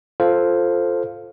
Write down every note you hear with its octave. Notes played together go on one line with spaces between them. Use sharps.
F4 A4 C5 F5